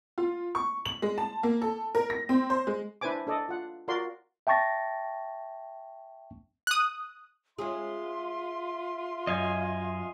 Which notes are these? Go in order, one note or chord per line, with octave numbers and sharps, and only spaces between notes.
F4
C#6
F#7
G#3
A5
A#3
A4
A#4
A#6
C4
C5
G#3
D4 E4 B4 C5 G#5 D6
D4 A4 D5 D#5
F4 F#5
F4 F#4 A#4 D5 C6
E5 G5 A5 C#6 A6 A#6
D#6 F#6
G#3 C#4 F4 G#4 E5 C6
F#2 D#5 F5 G#5